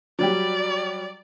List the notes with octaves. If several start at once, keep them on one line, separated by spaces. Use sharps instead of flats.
F#3 G3 G4 D5